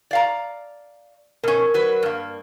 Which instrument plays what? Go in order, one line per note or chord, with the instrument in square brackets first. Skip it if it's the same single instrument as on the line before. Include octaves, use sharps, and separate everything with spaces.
[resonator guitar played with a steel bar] D5 F5 A#5
[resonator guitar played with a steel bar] B2 C#4 [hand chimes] A#4
[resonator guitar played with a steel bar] F#3 B4
G2 A#3